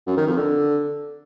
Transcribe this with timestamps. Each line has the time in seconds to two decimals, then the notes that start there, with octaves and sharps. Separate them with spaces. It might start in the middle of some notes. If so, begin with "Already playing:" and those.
0.07 F#2
0.17 D#3
0.27 F2
0.37 D3